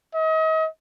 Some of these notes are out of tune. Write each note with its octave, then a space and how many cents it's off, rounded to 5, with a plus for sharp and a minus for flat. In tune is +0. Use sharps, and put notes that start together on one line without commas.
D#5 +40